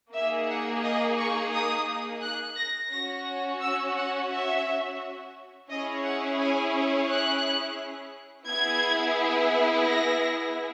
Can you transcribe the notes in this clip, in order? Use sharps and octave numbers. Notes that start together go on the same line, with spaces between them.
A#3 D#4 G#4 E5
F#5
D#5
C#6
D#6
F#6
A#6
C#4 F#4 A#6
E6
F#5
E5
C#4 E4 G#4 D#5
F#5
G#5
F#6
B3 E4 G#4 G#6
A#6